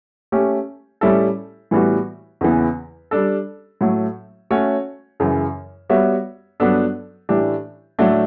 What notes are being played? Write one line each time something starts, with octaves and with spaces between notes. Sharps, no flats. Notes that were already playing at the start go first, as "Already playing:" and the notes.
A3 C#4 G4
A2 G3 C#4 E4 A4
A2 E3 G3 B3 F#4
E2 C#3 E3 B3
G3 D4 A4
A2 F#3 A3
A3 C#4 F#4 C#5
F#2 C#3 E3
G3 B3 F#4 C#5 E5
G2 F#3 B3 D4 A4
A2 E3 A3 D4 G4
A2 F#3 A3 D4